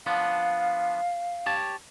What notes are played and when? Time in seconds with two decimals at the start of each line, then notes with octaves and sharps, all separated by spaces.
0.06 F3 B3 D4 F5
1.46 G4 C#5 A5